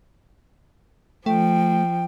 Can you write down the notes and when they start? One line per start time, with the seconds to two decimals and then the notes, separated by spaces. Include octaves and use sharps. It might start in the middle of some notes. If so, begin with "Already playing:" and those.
1.26 F3 A3 G5